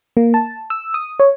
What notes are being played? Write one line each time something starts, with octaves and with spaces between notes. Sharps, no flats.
A#3
A5
E6
D#6
C#5